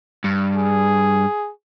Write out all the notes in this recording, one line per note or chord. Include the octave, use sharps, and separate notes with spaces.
G2
G#4